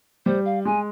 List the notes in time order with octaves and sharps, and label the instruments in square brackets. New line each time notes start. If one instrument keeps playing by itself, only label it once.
[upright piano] G3 [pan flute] C5
[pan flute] F5
[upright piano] G#3 [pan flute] G#5